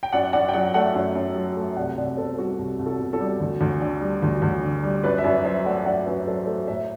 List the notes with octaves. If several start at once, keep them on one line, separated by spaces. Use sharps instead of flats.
G5
F#2 D5 F#5
F#2 D5 F#5
G5
F#3 D5 F#5
A3 D5 F#5
F#2
F#2
F#3
A3
C2 D5 F#5
C2 D5 F#5
B2 A4 C5
G3 F#4 A4
C2
C2
F#4 A4
B2
F#4 A4
G3
D2
D2
D3
G3
D2
D2
D3
G3
F#2 B4 D5
E5
F#2 B4 D5
F#3 C5 E5
A3 D5 F#5
E5
F#2 D5 F#5
F#2 B4 D5
F#3 A4 C5
A3 A4 C5
A2 C5 E5